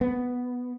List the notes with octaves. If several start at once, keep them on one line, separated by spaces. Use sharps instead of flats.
B3